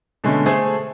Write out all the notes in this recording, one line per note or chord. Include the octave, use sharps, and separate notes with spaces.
B2 D3 G#3 A3 C#4
A3 G#4 A4 C5